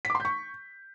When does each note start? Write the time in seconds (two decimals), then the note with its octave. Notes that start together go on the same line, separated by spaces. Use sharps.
0.05 B6
0.10 D6
0.15 C6
0.20 G6
0.25 C#6